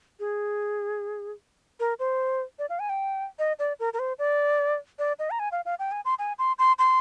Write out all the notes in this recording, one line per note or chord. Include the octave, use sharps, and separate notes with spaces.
G#4
A#4
C5
D5
F5
G#5
G5
D#5
D5
A#4
A#4
C5
D5
D5
D#5
A#5
G#5
F5
F5
G5
G#5
C6
G#5
C6
C6
C6